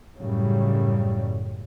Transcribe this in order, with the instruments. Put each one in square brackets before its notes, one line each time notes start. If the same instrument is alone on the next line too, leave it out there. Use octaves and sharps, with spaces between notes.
[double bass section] F#2 A2 C#3 G3